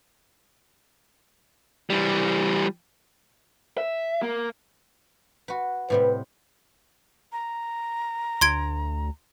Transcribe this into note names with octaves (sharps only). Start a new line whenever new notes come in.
E3 G3
E5
A#3
F#4 B4
A2 C3 G3 B4
A#5
D2 C6 G#6 D7